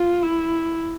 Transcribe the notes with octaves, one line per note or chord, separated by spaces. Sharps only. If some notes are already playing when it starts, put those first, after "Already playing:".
Already playing: F4
E4